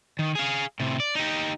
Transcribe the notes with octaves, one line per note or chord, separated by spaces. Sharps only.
D#3
G#4 F5
A2 C3
D5
D#4 G4